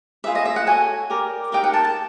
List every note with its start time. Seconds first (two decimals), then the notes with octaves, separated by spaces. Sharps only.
0.24 F4 G#4 B4 E5
0.35 D#5
0.45 E5
0.56 F#5
0.67 F#4 A4 C#5 G#5
1.10 G4 A#4 D5
1.52 D#4 G4 A#4 G5
1.64 F#5
1.73 A5
1.84 A5